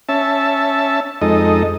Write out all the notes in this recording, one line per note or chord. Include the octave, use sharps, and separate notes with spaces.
C#4 E5 A5
F2 G#3 D#4 A4 D#5